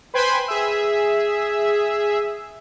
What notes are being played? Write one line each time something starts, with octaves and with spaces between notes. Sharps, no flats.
B4 C5 G5 G#5 B5 C6
G#4 E5